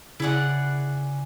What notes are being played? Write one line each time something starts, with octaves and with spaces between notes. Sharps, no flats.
C#3 E4 G#4 D5 F#5